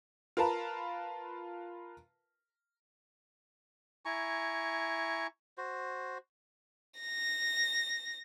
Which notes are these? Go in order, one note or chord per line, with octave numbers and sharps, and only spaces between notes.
F4 A#4 B4 F5 A5 A#5
E4 G#5 A#5 C#6
F#4 C5
A#6